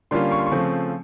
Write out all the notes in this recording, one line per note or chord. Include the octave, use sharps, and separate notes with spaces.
D3 G3 A#3 C#4 F4 C6
C#6
C6
C#6
C#3 F3 A3 C4